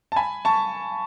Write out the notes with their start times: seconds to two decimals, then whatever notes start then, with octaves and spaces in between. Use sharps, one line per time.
0.12 A5
0.16 G#5 B5
0.45 A5 C#6